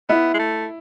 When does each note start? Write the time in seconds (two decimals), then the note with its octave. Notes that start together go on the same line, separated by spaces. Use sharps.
0.09 B3 E4
0.34 G#3
0.39 A3